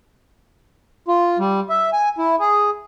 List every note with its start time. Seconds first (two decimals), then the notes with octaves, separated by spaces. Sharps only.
1.08 F4
1.39 G3
1.69 E5
1.93 G#5
2.18 E4
2.40 G#4